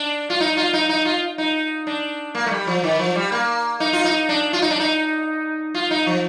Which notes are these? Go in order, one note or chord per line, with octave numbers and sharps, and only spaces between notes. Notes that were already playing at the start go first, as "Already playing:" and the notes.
Already playing: D4
F4
D#4
F4
D#4
D#4
F4
D#4
D4
A#3
A3
G3
F3
D#3
F3
G3
A#3
D#4
F4
D#4
D4
F4
D#4
D4
D#4
F4
D#4
F3